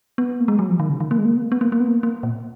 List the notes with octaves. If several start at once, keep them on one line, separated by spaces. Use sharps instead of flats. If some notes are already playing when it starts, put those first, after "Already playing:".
B3
A#3
G#3
F#3
F3
D#3
C#3
D#3
A#3
G#3
A#3
B3
A#3
B3
A#3
A#3
B3
A#3
A#3
A#2